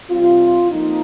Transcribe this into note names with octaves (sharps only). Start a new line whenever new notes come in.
C3 G3 C4 F4
F2 F3 A#3 D#4